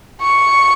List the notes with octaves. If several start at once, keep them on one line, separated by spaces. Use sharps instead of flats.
C#6